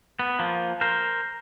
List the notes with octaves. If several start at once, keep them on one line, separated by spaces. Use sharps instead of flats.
B3
F3 A#3
A#4 C5